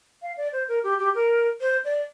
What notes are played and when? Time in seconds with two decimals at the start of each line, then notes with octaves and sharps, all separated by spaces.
0.22 F5
0.37 D5
0.52 C5
0.68 A#4
0.83 G4
0.98 G4
1.15 A#4
1.61 C5
1.84 D5